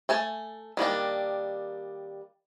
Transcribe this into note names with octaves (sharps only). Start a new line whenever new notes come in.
A3 G#5 A5
D#3 G3 A#3 D4